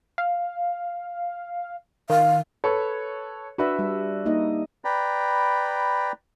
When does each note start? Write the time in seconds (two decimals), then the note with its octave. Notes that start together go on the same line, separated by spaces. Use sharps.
0.18 F5
2.10 D#3 F5
2.64 A4 B4 C#5
3.58 D4 F#4 B4 D5 E5
3.79 G3
4.26 A#3 D#4 D#5
4.85 B4 D5 G5 A#5 B5